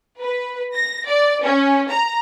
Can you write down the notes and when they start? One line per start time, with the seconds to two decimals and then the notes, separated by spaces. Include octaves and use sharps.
0.21 B4
0.75 A#6
1.08 D5
1.43 C#4
1.90 A#5